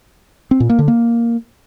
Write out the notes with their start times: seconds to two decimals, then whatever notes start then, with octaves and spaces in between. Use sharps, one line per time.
0.51 C4
0.60 A#2
0.69 A#3
0.79 D3
0.88 A#3